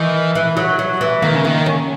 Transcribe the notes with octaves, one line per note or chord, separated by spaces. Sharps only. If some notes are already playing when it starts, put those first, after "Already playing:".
Already playing: D#3 E3
E3
F#3
F#3
E3
D#3 A#3
C#3
D#3 A#3
C#4